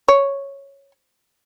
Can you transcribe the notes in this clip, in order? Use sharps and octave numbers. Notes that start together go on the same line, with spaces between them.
C#5